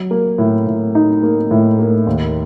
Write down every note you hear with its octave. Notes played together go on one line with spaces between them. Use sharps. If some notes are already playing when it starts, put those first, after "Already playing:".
Already playing: F#3
A#3
A2
A2
D#4
A#3
A2
A#3
D#2